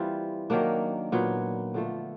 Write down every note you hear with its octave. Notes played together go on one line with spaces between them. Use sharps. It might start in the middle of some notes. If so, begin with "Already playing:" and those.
Already playing: E3 G3 A#3 C4 F4
D#3 F#3 A#3 D4
A#2 F#3 B3
D3 F3 A3